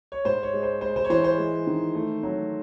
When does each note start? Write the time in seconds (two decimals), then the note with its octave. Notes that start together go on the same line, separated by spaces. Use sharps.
0.12 C#5
0.25 G#2 C5
0.43 C#5
0.53 G#3
0.63 C5
0.81 G#3 C5
0.96 C5
1.05 C#5
1.10 E3 C5
1.24 C5
1.38 G#3
1.67 D#3
1.95 A3
2.23 F#3